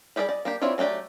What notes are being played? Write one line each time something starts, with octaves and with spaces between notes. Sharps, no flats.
G3 G4 G#4 A#4 D5
D5 D#5
A#3 D4 G4
C4 D4 E4 F4 C#5
F#3 A3 D4 G4 D5